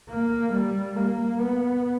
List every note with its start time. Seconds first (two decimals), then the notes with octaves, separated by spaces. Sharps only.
0.10 A#3
0.53 G3
0.96 A#3
1.40 B3